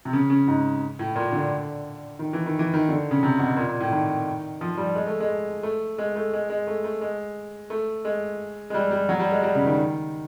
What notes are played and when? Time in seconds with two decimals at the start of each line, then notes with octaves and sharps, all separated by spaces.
0.05 C3
0.13 C#3
0.30 C#3
0.48 G#2
0.99 A2
1.16 A#2
1.33 D3
2.19 D#3
2.33 E3
2.46 D#3
2.59 E3
2.74 D#3
2.89 D3
3.11 C#3
3.23 C3
3.39 B2
3.57 A#2
3.69 A#2
3.80 A2
3.91 D#3
4.61 F3
4.77 G3
4.96 G#3
5.07 A3
5.20 G#3
5.63 A3
5.98 G#3
6.16 A3
6.33 G#3
6.50 G#3
6.67 A3
6.84 A3
7.01 G#3
7.70 A3
8.05 G#3
8.70 G#3
8.74 G3
8.91 G3
9.09 F#3
9.19 G3
9.32 G#3
9.43 G3
9.55 C#3
9.66 D#3
9.77 D#3